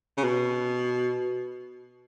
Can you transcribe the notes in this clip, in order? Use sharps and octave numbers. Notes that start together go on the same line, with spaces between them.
C#3
B2